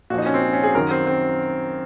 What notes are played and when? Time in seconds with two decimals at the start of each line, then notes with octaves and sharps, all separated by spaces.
0.10 A#2 F#4
0.14 F3 D#4
0.26 C#4
0.34 C4
0.42 C#4
0.53 C#4
0.64 G#4
0.75 F#2 D#3 A#4
0.91 C4
1.07 C4